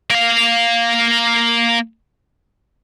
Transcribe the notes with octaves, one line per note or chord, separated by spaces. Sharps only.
A#3 F5